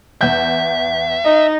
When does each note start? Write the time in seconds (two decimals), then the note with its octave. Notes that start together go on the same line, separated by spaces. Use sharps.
0.21 E2 E5 G6
1.24 D#4 D#5